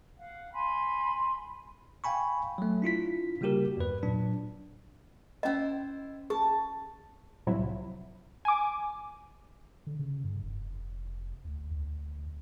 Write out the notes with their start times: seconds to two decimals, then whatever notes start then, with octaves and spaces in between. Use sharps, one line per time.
0.19 F5 F#5
0.53 G#5 B5 C6
2.04 F5 G5 G#5 B5 C#6
2.58 F#3 A3
2.82 D4 E4 F4 B6
3.41 C#3 G3 A#3 F#4 G4 A#4
3.77 E2 G2 B4
4.03 A#2 F#3 D4
5.43 C#4 E4 C5 D#5
6.30 G#4 A5
7.47 C2 A2 C3 F3 F#3 E4
8.45 G#5 D6
9.87 D3
9.99 C#3
10.24 G2
10.43 F1
11.45 D2
11.71 D2